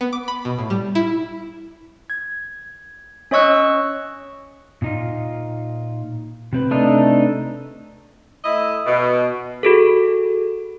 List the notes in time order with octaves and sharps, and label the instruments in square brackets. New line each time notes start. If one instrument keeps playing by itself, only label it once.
[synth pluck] B3
D6
B5
B2
A2
G3
E4
[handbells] G#6
C#4 C#5 D#5 C#6 E6 F#6
[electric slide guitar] A#2 D#4 F4
C3 C4 B4
[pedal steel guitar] A3 D4 D#4
[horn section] A3 E4 D#5
B2
[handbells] F#4 G#4 A4